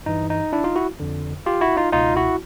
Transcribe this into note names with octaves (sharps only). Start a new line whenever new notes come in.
G2 E3 D#4
D#4
D4 E4
D#4 F4
E4 F#4
F2 D3
F4 G4
E4 F#4
D#4 F4
C#2 B2 D#4 F4
E4 F#4